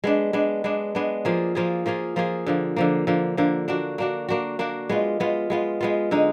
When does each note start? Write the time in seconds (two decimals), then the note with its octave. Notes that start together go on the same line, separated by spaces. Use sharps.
0.04 G#3 B3 D4
0.33 G#3 B3 D4
0.64 G#3 B3 D4
0.95 G#3 B3 D4
1.25 F3 A#3 F4 G#4
1.55 F3 A#3 F4 G#4
1.86 F3 A#3 F4 G#4
2.16 F3 A#3 F4 G#4
2.46 D3 F3 A#3
2.76 D3 F3 A#3
3.07 D3 F3 A#3
3.37 D3 F3 A#3
3.68 A#3 D4 F#4
3.98 A#3 D4 F#4
4.29 A#3 D4 F#4
4.59 A#3 D4 F#4
4.89 G#3 B3 F4
5.20 G#3 B3 F4
5.50 G#3 B3 F4
5.81 G#3 B3 F4
6.11 D3 G#3 D#4